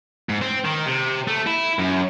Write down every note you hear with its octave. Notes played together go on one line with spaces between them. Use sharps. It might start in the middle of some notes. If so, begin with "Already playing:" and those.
G#2
C4
D#3
C3
A3
E4
F#2